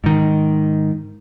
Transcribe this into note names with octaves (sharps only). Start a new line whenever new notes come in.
G#2 D#3